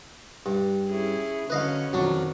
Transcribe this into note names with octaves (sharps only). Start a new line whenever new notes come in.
G2
C#4 E4 G#4
D3 F#3 C#4 B4 D#5 F5
F2 D#3 F#3 D4